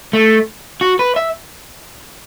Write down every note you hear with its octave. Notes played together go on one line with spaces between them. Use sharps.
A3
F#4
B4
E5